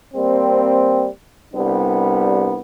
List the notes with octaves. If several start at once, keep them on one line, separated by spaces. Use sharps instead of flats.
G3 A#3 C4
C2 G3 B3 D4